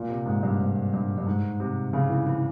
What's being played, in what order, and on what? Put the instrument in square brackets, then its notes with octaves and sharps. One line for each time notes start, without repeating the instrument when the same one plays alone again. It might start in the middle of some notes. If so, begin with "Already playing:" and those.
Already playing: [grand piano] A#2
C3
G#2
G2
G#2
G2
G2
G#2
C3
C#3
E3
E3